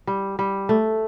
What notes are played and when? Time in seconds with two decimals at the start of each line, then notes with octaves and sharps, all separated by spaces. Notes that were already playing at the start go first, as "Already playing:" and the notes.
0.07 G3
0.39 G3
0.69 A3